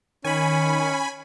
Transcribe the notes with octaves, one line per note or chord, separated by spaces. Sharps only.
D#3 C#4 G#5 B5